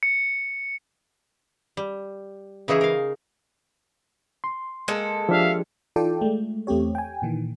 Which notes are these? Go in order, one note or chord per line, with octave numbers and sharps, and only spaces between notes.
C#7
G3
C#3 E3 D#4 E4 G#4
A#4 F5
C6
G#3 A#3 A4
F3 D4 G4 E5 F5
E3 D#4 F4 A4 D5 G5
G#3 A3
E2 A3 C4 G4 C#5
G5 G#5
A#2 D#3 E3